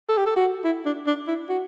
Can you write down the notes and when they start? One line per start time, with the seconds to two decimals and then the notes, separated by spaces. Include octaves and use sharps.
0.09 A4
0.17 G4
0.26 A4
0.37 F#4
0.64 E4
0.86 D4
1.07 D4
1.28 E4
1.49 F#4